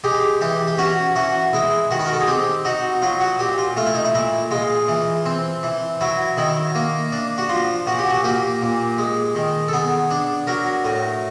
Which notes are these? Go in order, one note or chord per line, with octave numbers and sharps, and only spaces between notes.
G#3 G4
E3 G4
G4
C#4 F#4
E3 F#4
G#3 E4
D#3 F#4
B4
A#4
A4
G#4
C4 G4
D#4 F#4
F#3 F4
F#4
A#2 G4
F4
A3 F4
E4
D#4
E4
A#2 E4
G#3 F4
E3
C4
E3
F#3 E4
D#3 E4
A#3
D4
F#4
F3 F4
A#2 F#4
G4
F#4
A#3 G4
A#2
G#3
D#3
A4
B3 G#4
D4
F#3 A#4
A2